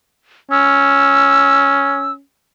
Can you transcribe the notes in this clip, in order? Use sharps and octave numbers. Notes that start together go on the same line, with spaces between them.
C#4 E6